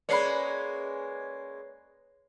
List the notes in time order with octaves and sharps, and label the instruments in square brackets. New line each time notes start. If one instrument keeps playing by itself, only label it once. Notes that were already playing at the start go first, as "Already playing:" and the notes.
[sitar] G#3 A#3 C#4 [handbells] B4 C#5 C7 [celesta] D5 B5